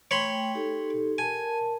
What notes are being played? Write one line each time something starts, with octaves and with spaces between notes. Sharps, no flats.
A3 C#5 G5 B5 C6
D#4 G4 A4
A#4 G#5 A5